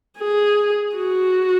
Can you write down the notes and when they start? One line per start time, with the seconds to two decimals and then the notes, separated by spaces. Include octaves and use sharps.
0.19 G#4
0.97 F#4